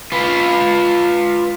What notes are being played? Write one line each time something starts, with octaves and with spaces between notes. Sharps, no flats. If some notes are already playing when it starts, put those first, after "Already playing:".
F4 B4